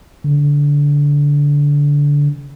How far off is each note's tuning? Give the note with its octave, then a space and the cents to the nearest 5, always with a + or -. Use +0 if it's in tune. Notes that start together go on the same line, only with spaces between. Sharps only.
D3 -20